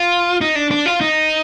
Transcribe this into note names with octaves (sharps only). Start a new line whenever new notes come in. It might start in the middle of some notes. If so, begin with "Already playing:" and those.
Already playing: F4
D#4
D4
D4
F4
D#4